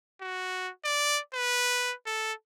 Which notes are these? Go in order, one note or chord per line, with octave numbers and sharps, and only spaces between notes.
F#4
D5
B4
A4